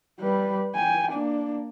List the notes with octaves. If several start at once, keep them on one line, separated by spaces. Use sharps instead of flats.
G3 B4
G5 G#5
A#3 D4